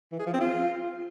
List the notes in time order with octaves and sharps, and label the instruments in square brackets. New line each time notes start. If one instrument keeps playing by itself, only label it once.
[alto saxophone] E3
G#4
F3
C4
F4